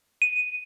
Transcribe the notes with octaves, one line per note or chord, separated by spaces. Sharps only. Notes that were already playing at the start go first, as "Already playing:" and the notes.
D#7